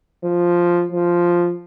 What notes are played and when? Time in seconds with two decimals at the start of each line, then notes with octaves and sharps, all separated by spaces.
0.24 F3
0.92 F3